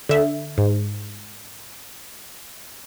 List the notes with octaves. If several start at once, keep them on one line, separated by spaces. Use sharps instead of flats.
D3 E5
G#2